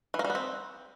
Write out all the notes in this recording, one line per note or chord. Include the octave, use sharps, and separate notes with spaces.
E3
A#3
G3
B3
C4